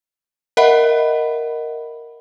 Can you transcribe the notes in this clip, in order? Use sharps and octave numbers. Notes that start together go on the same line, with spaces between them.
A#4 D#5 E5 F#5 B5